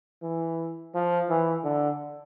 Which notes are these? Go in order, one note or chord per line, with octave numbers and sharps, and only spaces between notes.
E3
F3
E3
D3